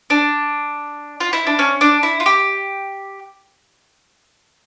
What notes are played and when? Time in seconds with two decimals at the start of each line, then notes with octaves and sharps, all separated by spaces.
0.10 D4
1.20 F4
1.33 E4
1.47 D4
1.59 C#4
1.81 D4
2.03 E4
2.20 F4
2.26 G4